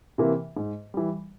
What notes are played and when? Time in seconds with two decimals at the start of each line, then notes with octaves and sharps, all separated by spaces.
0.18 C3 E3 A#3
0.56 G#2
0.94 E3 G3